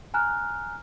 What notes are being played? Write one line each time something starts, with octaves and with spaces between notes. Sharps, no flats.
G#5 A#5 F6 F#6